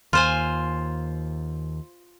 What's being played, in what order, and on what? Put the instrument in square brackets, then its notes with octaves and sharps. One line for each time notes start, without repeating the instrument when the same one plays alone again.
[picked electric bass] D#2 [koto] F4 C5 G#5